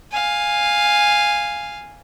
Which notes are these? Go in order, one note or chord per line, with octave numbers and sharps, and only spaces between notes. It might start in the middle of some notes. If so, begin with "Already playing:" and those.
F5 G#5